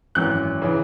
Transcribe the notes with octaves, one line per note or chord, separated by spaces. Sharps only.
G#1 F#2 E3 F#6
C#3 E3